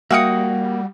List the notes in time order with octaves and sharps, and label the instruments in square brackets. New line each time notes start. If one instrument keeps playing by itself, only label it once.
[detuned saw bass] G3 [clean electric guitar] A#3 [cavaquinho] F#4 G5 D#6 [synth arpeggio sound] E5 F5 C#7